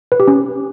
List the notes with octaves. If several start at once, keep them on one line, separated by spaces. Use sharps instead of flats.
B4
G4
C#4